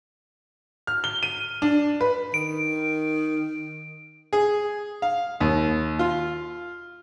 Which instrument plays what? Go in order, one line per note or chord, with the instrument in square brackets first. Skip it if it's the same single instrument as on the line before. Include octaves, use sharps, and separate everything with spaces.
[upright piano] F6
G7
D#7
D4
B4
[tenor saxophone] D#3 [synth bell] D7
[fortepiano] G#4
F5
D#2
F4